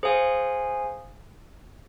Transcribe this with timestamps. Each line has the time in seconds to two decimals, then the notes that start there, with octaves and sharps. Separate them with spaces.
0.03 G#4 C5 F5 G#5